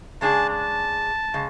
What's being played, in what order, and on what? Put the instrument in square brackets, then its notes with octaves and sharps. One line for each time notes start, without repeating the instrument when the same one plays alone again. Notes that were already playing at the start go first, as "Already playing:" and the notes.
[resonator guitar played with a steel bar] C#3 G#3 D4 G#4 [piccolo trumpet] A5
[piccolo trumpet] A5
[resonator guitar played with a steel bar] C#3 G#3